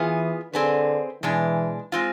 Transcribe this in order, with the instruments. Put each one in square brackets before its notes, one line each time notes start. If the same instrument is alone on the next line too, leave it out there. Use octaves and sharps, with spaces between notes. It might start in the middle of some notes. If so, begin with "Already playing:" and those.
Already playing: [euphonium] E3 [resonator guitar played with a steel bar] B3 F4 G#4
[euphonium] D3 [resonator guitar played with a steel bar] C4 G#4 B4
[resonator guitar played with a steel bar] B2 G#3 D4 [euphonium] E3
[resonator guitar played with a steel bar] G#3 C4 F4